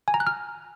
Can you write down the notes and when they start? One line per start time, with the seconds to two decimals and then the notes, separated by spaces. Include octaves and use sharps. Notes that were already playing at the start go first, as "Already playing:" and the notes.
0.08 G#5
0.14 A#5
0.20 F#6
0.27 F6